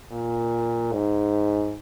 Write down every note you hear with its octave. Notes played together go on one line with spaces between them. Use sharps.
A#2
G#2